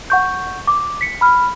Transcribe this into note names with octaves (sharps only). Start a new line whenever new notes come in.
F#5 C#6 G6
D6
B6 C#7
B5 F6